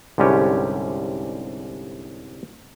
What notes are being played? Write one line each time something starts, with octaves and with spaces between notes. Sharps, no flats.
C2 G#2 D3 G3 C#4 G4